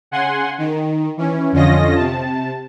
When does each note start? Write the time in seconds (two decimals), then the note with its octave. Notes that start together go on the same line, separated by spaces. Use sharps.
0.11 C#3 F#5 G#5 C6
0.58 D#3
1.17 E3 C#4
1.52 F2 D3 C#4 F4 D#5 A#6
1.95 C3 A5